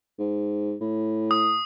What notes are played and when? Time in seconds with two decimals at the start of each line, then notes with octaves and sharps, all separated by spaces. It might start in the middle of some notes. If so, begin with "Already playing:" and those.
0.19 G#2
0.81 A2
1.31 D#6